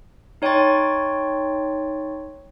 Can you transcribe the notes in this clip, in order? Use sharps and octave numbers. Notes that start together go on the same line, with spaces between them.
D#4 C#5 G5 C6 C#6 A6